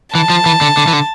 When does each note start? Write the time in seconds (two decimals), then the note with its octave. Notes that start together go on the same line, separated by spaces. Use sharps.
0.14 E3 A5
0.30 F3
0.46 E3
0.61 D3
0.77 D3
0.88 E3
0.93 D3